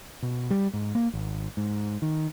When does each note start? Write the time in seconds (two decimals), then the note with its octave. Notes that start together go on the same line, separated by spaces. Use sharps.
0.23 B2
0.50 G3
0.73 G#2
0.95 A#3
1.14 G#1
1.57 G#2
2.02 D#3